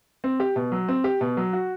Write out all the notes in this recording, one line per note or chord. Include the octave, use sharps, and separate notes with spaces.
C4
G4
B2
F#3
C4
G4
B2
F#3
F#4